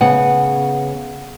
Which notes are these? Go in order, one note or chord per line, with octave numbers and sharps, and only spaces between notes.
C#3 B3 F#5